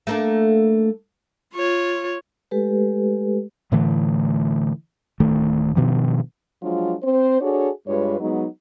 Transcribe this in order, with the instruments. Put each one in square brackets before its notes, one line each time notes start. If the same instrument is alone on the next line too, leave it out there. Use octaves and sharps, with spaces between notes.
[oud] A3 A#3 D4
[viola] F4 C#5
[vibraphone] G#3 A3 G4 A4 B4
[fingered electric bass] A2 D3 E3 A3
D1 D#3 A3
G2 B2 D#3 F3
[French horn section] F3 F#3 G#3 D4 F4
C4 C5
D4 F#4 G#4 A4 C#5
G2 G#3 F4 B4 C#5
F#3 G#3 B3 D#4